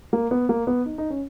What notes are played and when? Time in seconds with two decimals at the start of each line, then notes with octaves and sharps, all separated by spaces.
0.13 A#3
0.31 B3
0.49 A#3
0.67 B3
0.86 D#4
0.98 D#4
1.10 C#4